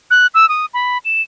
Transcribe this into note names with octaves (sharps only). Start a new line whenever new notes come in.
F#6
E6
D#6
B5
E7